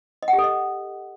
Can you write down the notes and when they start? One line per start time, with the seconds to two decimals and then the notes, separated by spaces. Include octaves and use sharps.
0.23 D#5
0.28 F#5
0.33 G4
0.38 A4
0.44 D#5